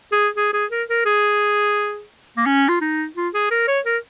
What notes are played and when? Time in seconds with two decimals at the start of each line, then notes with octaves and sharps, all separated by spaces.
0.13 G#4
0.37 G#4
0.54 G#4
0.71 A#4
0.90 A#4
1.06 G#4
2.37 A#3
2.46 C#4
2.69 F4
2.81 D#4
3.17 F4
3.34 G#4
3.51 A#4
3.68 C#5
3.86 A#4